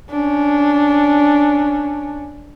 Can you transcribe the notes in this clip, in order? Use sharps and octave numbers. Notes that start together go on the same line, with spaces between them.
C#4 D4